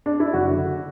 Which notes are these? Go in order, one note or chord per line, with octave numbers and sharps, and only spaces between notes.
D4
E4
F#1 F#4
D3